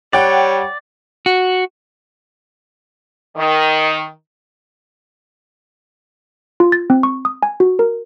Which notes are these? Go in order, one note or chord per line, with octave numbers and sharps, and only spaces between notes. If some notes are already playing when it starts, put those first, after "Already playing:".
G3 C#5 D5 F#5 G5
F#4
D#3
F4
A6
C4
C#6
D#6
G#5
F#4
A#4